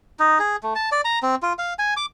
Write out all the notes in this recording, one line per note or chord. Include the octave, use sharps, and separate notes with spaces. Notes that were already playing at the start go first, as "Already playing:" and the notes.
D#4
G#4
A3
A5
D5
A#5
C4
F4
F5
G#5
D6